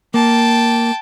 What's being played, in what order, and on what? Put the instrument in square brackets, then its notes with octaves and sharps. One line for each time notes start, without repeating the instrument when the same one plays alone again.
[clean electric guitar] A#3 [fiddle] G5 A5